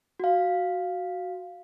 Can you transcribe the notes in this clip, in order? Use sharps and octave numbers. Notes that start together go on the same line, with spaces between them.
F#4 F5